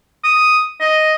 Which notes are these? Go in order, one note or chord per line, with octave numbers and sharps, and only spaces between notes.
D#6
D#5